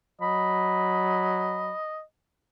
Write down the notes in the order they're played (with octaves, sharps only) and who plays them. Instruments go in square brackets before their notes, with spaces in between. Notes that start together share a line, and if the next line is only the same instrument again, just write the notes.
[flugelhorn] F#3 [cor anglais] D#5 [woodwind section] B5